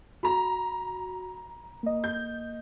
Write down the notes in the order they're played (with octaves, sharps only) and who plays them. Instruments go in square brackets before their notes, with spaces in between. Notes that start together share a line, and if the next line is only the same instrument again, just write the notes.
[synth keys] F#4 [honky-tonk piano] A#5 B5
[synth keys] A#3 D#5
[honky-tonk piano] G6